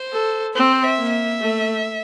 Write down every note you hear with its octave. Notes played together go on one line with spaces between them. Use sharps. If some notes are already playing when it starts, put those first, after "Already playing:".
Already playing: C5
A4
C4 C5
E5
A#3
E5
A3